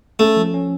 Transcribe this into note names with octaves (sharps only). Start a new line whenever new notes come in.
A3 C#4
F3
C#4